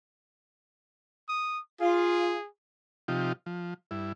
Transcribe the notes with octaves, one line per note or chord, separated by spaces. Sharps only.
D#6
F4 G#4
C3 F3 D#4 F4 G4
F3
G2 E4